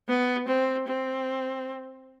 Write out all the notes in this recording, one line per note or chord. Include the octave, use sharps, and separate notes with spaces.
B3
C4
C4